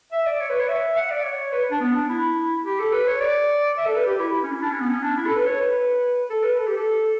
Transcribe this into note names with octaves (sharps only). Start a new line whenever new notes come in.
E5
D5
C#5
B4
C#5
E5
F#5
D5
C#5
B4
D4
B3
D4
E4
G4
A4
B4
C#5
D5
E5
A4
B4
G4
E4
C#4
E4
D4
C#4
B3
C#4
D4
E4
A4
B4
C#5
B4
A4
B4
A4
G4
A4